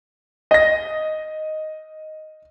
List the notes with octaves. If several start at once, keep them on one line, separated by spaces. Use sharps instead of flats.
D#5 A#6